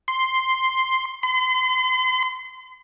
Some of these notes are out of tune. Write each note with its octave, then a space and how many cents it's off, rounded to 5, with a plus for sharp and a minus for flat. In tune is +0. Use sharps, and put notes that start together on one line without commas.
C6 +0
C6 -40